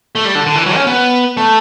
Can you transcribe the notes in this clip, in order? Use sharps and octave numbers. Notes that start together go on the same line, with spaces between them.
A3
G3
D3
D3
E3
F#3
C#4
B3
A3